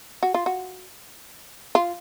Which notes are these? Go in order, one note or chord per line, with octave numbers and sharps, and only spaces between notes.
F#4
F4
F#4
F4